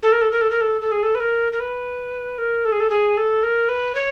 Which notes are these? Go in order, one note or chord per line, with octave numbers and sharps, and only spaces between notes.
A4
A#4
A4
A#4
A4
A#4
A4
A4
G#4
A4
B4
A#4
A#4
B4
A#4
A4
G#4
A4
G#4
A4
A#4
B4
C#5